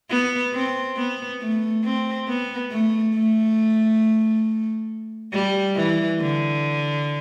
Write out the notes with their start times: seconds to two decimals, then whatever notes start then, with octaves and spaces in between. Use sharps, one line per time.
0.10 B3
0.54 C4
0.97 B3
1.41 A3
1.85 C4
2.28 B3
2.72 A3
3.15 A3
5.33 G3
5.77 E3
6.21 D3